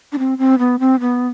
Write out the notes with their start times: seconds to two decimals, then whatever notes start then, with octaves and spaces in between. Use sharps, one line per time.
0.12 D4
0.19 C4
0.38 C4
0.59 B3
0.79 C4
1.00 B3